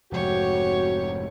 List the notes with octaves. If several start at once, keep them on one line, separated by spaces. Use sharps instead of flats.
F1 G#2 F3 F#4 G4 C#5